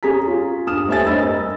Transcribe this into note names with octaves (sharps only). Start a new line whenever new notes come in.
C#4 G#4 A#5 B6
F4
G2 D#6 F6 E7
A3 C4 C#5 E5 G#5 A6
G2 D#5 B5 E6 A6
A#4 E6